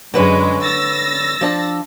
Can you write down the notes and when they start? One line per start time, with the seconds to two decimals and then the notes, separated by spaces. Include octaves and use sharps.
0.14 F#2 D3 G#3 B4 C#5
0.64 E6 A6 A#6
1.41 F3 D4 A5